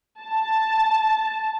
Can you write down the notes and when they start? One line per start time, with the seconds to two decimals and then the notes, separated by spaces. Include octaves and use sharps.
0.21 A5